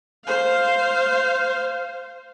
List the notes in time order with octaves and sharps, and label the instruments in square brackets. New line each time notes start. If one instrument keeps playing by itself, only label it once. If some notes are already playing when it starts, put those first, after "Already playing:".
[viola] C5 F5